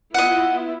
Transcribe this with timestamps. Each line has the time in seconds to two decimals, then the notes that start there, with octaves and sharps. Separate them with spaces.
0.14 B3 E4 F4 D#5 F#5